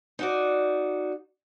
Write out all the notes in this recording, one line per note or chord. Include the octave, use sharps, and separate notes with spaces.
D#4 F#4 D5